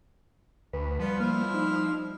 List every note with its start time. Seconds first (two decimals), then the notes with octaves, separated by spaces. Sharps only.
0.73 D2 B4
0.99 F3 G3 B3 F4
1.20 A#3 C4 E4 F6
1.54 D#4